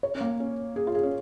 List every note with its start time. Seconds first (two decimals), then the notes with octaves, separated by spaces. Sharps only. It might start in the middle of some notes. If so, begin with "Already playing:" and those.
0.03 C#5
0.15 C#4
0.21 A#3
0.40 C#4
0.76 G#4
0.87 F4
0.95 G#4
1.03 C#4